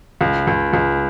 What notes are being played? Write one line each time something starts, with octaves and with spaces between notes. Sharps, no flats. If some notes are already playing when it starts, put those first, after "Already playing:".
C#2
C#2
C#2